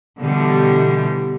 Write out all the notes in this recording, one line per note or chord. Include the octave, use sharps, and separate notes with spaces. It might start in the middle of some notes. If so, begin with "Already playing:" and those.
B2 D3 E3 G3